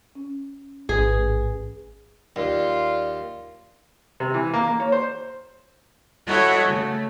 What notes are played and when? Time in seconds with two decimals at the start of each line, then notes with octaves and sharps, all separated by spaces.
0.15 C#4
0.89 A1 G#2 G#4 B4 G#5
2.36 D#2 F4 D5
4.20 C3
4.34 E3
4.54 A#3
4.68 A#3
4.80 C#5
4.92 C5
6.26 E4 F#4 A4 C#5 D#5 F#5
6.67 C#3 A3